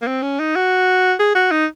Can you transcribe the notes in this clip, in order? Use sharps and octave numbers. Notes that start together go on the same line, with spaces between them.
A#3
C4
C#4
D#4
F#4
G#4
F#4
D#4